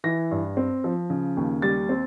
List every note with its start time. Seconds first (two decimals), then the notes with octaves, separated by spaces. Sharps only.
0.04 E3 A#6
0.31 G2
0.57 C4
0.84 F3
1.10 C#3
1.37 D#2
1.62 G3 A6
1.89 C4